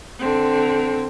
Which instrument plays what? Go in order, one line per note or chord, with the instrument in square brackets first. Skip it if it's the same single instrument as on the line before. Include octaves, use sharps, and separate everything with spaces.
[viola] D3 C4